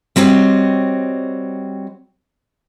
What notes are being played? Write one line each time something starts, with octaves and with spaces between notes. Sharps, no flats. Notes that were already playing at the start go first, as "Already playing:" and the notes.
G3 C4 F#4 C#5 D#5